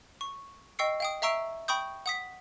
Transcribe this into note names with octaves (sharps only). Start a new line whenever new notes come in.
C#6
D#5 G5 C#6 E6 C7 C#7
F5 G5 D#6
E5 F5 A#5 C#6 E6 D7
G5 B5 C#6 D#6 G6
F#5 D#6 B6